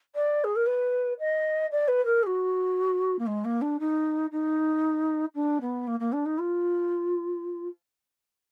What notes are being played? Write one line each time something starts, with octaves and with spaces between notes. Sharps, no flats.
D5
G#4
A#4
B4
D#5
D5
B4
A#4
G#4
F#4
A#3
G#3
A#3
D4
D#4
D#4
D4
B3
A#3
A#3
D4
D#4
F4